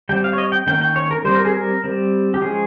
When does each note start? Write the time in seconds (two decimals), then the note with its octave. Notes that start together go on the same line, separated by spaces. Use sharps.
0.09 G3 G5
0.12 C4
0.24 F5
0.33 C#5
0.38 D#5
0.52 G5
0.66 D#3 A#3 C#4 G5
0.81 G5
0.96 C#5
1.11 A#4
1.24 G3 C4 C5
1.35 A#4
1.45 G#4
1.54 A#4
1.84 G3 C4
2.34 G4
2.41 F3 G#3 C#4 G#4